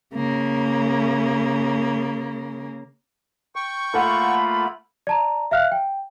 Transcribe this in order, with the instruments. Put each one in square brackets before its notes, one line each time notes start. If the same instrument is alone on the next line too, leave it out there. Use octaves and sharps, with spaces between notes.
[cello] C#3 A#3
[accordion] G5 C#6
[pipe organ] A3 A#3 F4 [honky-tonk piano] A4 F#5 [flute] B5
[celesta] D5 A5 A#5
E5 F5 F6 F#6
G5